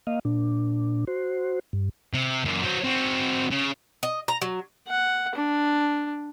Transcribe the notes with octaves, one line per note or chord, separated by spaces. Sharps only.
A#3 D#5 F5
A#2 D4
F#4 C5
G2
C3
F#2 A#2
F#3 C5
C4 F#4
C#3
D#5
A#5
F#3
F#5
D4